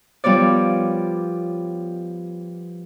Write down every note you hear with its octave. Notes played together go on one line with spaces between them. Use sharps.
F3 G3 B3 C#5 D5